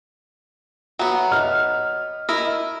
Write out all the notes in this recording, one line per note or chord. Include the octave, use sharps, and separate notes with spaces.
F#3 B3 E5 F#5 A#5
D#5 F6
E4 A#4 D#5